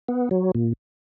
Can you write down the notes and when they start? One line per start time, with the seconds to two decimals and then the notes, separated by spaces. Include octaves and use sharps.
0.08 B3
0.31 F#3
0.55 A#2